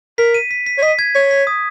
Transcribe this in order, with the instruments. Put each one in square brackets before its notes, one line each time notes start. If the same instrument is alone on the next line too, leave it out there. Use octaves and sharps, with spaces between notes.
[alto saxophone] A#4 [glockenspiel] B6
[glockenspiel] D#7
B6
B6
[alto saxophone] C#5
[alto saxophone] D#5 [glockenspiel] B6
[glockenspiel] G#6
[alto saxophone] C#5 [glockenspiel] B6
[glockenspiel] B6
D#6